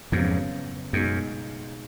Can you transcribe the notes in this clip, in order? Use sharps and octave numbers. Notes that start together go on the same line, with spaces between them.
F2 G#2 C#3 F#3 B3
F#2 B2 G#3 D#4 G#4